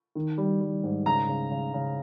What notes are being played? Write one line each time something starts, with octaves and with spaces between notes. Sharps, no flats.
D#3
G3
G3
G#2
C#3 A#5
C#3
C#3
C#3